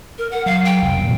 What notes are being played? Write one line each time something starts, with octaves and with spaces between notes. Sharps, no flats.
A#4
F#5
F#3 F5
G5
F1 C2 F2
A#2 E3 F#3